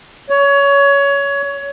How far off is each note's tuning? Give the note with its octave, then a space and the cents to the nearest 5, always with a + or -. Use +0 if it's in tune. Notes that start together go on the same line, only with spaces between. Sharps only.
C#5 +20